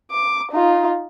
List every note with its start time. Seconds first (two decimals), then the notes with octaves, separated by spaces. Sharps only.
0.11 D6
0.52 D#4 F4